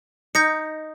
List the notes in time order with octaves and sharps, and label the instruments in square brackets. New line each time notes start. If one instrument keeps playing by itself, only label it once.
[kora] D#4 [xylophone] G6 A#6 C#7